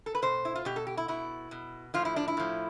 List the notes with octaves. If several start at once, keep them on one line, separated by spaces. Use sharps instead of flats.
A4
B4
B2 C5
E4
F4
B2 G4
A4
G4
E4
B2 E4
B2
A2 F3 F4
E4
D4
E4
A2 F3